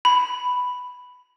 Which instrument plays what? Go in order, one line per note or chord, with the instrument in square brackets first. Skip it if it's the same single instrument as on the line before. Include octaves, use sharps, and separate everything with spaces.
[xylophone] B5